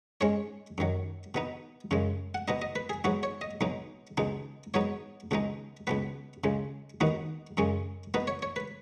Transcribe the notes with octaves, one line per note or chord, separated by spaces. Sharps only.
G#2 G#3 C#4 C#5
F#2 D#3 F#3
B2 B3 D#4
F#2 C#3 G#3
F#5
B2 B3 D#4 D#5
D#5
B4
G#4
G#2 F#3 B3 D#4 F#4
C#5
D#5
B1 B2 F#3 D#4
C#2 B2 G#3 D#4
G#2 F#3 B3 D#4 C#5
C#2 B2 G#3 D#4
C#2 B2 B3 B4
C#2 C#3 G#3
D#2 D#3 B3 D#4 F#4
F#2 C#3 G#3 C#4
B2 B3 D#4 B4
C#5
C#5
B4